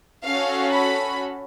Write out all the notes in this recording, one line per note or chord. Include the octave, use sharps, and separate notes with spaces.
C#4 F#4 A4 F5
B5